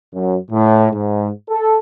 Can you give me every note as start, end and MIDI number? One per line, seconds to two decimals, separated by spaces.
0.13 0.36 42
0.51 0.87 45
0.92 1.29 44
1.48 1.77 69